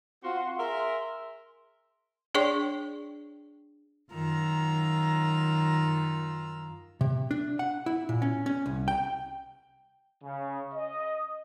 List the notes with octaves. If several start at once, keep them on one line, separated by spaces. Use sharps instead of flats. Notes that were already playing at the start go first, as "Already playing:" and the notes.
C4 F4 F#4 F5 F#5 C6
G#4 A#4 E5 C6
D4 G#4 C#5 D5 G5 C#6
F#2 D#3 F4 A#5 E6
C3
D4
F#5
E4
A#2
C#4
C#4
C2
G5
C#3
D#5